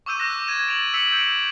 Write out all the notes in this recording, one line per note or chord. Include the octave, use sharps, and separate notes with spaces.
C#6 D6 E6 G6 D#7
D6 F#6 A#6
G#6 D#7 E7
A6 D7 D#7 F7 F#7
E6 B6 C#7 F7 F#7
G6 D7